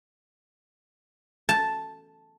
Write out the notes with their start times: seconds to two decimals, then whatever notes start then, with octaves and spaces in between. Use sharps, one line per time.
1.49 A5